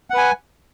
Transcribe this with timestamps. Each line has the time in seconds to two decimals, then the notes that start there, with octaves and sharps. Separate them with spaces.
0.10 F#5
0.14 B4
0.18 G#5